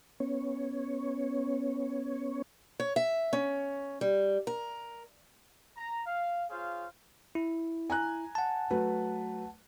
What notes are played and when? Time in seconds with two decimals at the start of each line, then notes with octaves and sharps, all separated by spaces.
0.20 B3 C#4 C#5
2.80 C#5
2.96 E5
3.33 C#4
4.01 G3
4.47 A#4
5.77 A#5
6.06 F5
6.50 F4 G#4 C5 C#5 F5
7.35 E4
7.90 G#5 A#5 F#6
8.35 F#5 A5
8.71 F#3 A3 B4